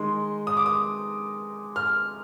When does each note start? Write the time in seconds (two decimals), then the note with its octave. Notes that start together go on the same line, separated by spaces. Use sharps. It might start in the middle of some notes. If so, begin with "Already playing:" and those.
Already playing: D#3 G#3 D#4 C6
0.47 D#6
0.57 D6
0.66 D#6
1.76 F6